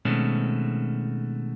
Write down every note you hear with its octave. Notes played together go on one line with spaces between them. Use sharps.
B2 D#3 G#3 A3 C4 C#4